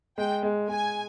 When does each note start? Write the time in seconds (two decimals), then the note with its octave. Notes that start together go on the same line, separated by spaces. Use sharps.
0.17 G#3 G5
0.43 G#3
0.68 G#3 G#5